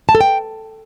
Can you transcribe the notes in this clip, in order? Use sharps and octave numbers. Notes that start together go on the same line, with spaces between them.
A5
A4
G5